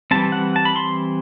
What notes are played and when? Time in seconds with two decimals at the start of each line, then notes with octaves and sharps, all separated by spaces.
0.11 E3 G3 C4 A5
0.32 F#5
0.56 A5
0.65 B5
0.76 C6